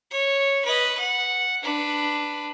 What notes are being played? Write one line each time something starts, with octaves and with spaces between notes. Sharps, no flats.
C#5
B4 D#5
F#5
D4 B4